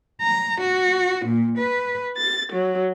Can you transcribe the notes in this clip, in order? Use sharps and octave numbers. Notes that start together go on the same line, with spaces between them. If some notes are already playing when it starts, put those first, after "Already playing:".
A#5
F#4
A#2
B4
A6
F#3